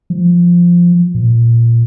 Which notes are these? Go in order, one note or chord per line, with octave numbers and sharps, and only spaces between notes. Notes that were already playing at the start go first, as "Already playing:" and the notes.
F3
A#2